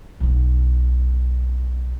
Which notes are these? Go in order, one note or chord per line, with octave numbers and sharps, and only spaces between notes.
B1 B2